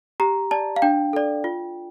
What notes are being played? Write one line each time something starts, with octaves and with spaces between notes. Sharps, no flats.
G4 A#5
D5 A5
F5
D4 G5
A4 D5
F4